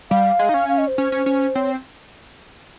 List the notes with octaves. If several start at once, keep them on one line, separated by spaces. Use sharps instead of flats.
G3 F5
G#3
D#4
C#4
F5
D#5
C5
C#4
C#4
C#4
C4 C#5